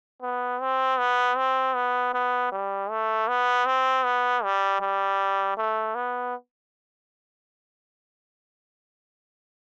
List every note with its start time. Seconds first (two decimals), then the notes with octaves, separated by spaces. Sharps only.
0.22 B3
0.61 C4
0.99 B3
1.37 C4
1.75 B3
2.14 B3
2.52 G3
2.90 A3
3.28 B3
3.66 C4
4.05 B3
4.43 G3
4.81 G3
5.57 A3
5.95 B3